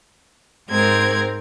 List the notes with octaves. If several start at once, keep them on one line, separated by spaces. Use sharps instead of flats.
G#2 G#3 C4 A#4 G#6